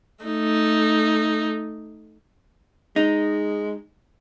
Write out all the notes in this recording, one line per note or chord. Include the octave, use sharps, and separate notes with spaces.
A3 D#4
G#3 D#4